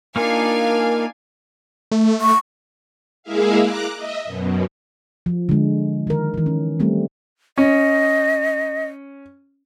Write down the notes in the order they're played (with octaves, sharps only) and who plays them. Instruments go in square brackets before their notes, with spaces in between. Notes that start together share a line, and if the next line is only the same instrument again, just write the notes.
[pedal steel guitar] A#3 D#4 F4 [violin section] D4 F5 G#5 [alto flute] A#4
[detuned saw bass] A3
[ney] C#6
[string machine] G#3 A#3 E4 G#4 E5 F5
A#5 D6 F#6
D#5 E5
F#2 B2
[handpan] F3
D3 G#3
D#3 A#4
D#3 E3
C#4
G3 A3 C4
[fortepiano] C#4 [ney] D#5